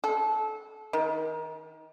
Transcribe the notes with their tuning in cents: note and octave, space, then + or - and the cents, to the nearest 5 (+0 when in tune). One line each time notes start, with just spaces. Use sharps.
A4 -25
D#3 +25